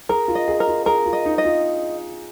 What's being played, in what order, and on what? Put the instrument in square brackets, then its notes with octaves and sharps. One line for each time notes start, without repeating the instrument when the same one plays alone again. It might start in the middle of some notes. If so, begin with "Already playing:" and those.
[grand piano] G#4 [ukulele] A#4
[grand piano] F4
[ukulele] D#5
[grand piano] G#4
[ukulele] A#4
[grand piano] F4
[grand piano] G#4 [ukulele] A#4
[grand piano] F4
[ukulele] D#5
[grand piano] D#4
[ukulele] D#5
[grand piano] F4